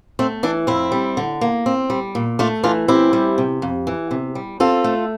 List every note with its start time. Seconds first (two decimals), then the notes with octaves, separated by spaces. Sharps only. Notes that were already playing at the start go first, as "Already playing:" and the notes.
0.19 A3 C4
0.43 E3 D4
0.67 F2 C4 E4
0.92 G3
1.17 D3
1.41 A#3
1.66 C4
1.90 G3
2.15 A#2
2.39 A3 D4 F4
2.63 E3 D4 F4
2.88 C4 E4 G4
3.13 G3
3.38 C3
3.62 F2
3.87 E3
4.11 C3
4.35 G3
4.60 C4 F4 A4
4.84 A3